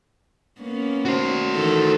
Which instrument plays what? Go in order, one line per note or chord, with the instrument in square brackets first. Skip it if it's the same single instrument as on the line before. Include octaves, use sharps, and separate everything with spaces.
[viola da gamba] A#3 B3 C#4
[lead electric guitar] F#4 C5
[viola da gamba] D#3 E3 A4